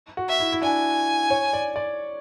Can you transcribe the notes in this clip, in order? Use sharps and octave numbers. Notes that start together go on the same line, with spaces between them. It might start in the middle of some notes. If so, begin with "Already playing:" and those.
F#4
E5
E4
E4
D4 G#5
C#5
D5
D5